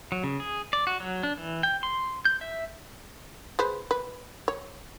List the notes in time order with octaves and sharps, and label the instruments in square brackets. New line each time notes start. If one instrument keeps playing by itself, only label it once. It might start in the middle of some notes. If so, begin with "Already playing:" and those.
[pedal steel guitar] F#3
C#3
G#4
D5
F#4
F#3
D4
E3
G5
C6
G6
E5
[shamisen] G#3 B4 C5
B4
C#5